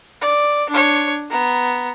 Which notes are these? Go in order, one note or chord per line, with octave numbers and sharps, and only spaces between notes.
D5
D4 C#5
B3 A#5